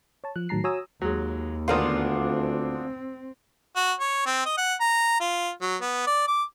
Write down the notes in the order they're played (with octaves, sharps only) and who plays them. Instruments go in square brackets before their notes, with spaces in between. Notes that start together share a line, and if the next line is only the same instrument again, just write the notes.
[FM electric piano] C#5 A5
F3 F#6
A2 D#3 F#3 A5 A#5 C7
F#4 C#5 G#5 A#5 D#6 E6
[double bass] D#2 [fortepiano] F#3 G#3
[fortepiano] G#1 A#4 C5 [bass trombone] D2 [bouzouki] B3 D4 F4
[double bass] C4
[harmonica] F#4
C#5
C4
D#5
F#5
A#5
F4
F#3
B3
D5
D6